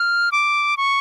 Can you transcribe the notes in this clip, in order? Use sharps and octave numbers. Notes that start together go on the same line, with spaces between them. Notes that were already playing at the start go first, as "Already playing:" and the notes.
Already playing: F6
D6
C#6